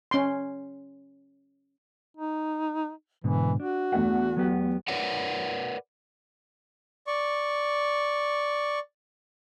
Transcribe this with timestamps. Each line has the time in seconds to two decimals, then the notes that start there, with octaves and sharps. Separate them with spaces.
0.11 C#4 C6
2.17 D#4
3.24 G#2 B2 D3 E3
3.60 D4 F#4
3.92 E2 A3 F#5
4.37 F#3 B3 G4
4.88 A#4 B4 C#5 D5 F#5
7.07 D5 C#6